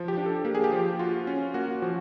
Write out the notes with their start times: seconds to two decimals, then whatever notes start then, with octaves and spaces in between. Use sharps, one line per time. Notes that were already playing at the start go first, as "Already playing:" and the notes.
Already playing: F3
0.08 G4
0.17 D4
0.26 A4
0.45 A#3 G4
0.55 G#4
0.64 G4
0.73 F3
0.99 F4 F#4
1.27 C#4
1.54 A#3 F#4
1.82 F3 F#4